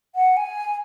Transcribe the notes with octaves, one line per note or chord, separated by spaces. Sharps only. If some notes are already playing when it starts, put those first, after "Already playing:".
F#5
G#5